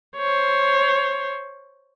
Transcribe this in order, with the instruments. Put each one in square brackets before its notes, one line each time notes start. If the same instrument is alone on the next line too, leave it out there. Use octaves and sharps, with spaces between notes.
[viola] C5 C#5